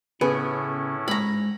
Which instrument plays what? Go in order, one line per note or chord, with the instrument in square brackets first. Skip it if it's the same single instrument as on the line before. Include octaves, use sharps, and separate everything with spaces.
[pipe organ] A2 C#4 E4 [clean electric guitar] C#3 [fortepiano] B3 [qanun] G#4
[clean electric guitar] G#2 [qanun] A#5 B5